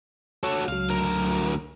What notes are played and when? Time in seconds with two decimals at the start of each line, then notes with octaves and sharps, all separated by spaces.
0.43 F#4 A4 C#5 D6
0.68 C#2 F#3 F5
0.89 D2 A#4